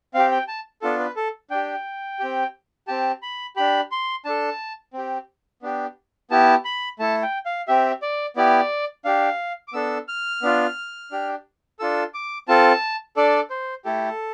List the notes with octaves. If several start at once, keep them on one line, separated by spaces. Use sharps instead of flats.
C4 G4 F5
G5
A5
B3 D4 F4 A4
B4
A4
D4 G4 G5
C4 G4
C4 G4 A5
B5
D4 G4 B5
C6
D4 A4 A5
C4 G4
B3 D4 G4
B3 E4 G4 A5
B5
A3 E4 A4 A5
G5
F5
C4 G4 E5
D5
B3 E4 G4 D5
D4 G4 F5
D6
B3 D4 A4 E6
F6
B3 D4 F4
D4 G4
D4 F4 A4 E6
D6
C4 F4 A4 A5
D4 A4 D5
C5
A3 E4 G4 A4